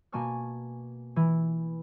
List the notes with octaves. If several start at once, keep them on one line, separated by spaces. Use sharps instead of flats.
B2 A#3 G#5 A5 C#6 F6
E3